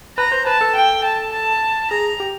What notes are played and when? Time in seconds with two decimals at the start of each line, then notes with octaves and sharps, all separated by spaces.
0.18 B4 A#5
0.32 C5
0.46 B4 A5
0.61 A4
0.75 G5
1.04 A5
1.32 A5
1.91 G#4 A#5
2.20 G4